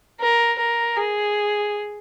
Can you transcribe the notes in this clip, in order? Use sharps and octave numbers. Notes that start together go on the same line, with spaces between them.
A#4
A#4
G#4